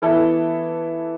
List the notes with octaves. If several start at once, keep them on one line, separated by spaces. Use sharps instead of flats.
E3 B3 E4 A4